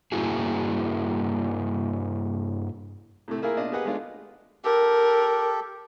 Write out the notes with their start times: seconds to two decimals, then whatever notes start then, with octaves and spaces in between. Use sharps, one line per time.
0.12 G2 A#3 E4 F#4 G#4
3.28 A2 C3 A3
3.42 A#3 E4 F4 G#4 A#4
3.57 B2 D4 F4 D#5
3.72 G4 G#4 A#4 B4 D#5 F#5
3.85 G#3 A3 B3 D4 F4
4.64 G4 A4 A#4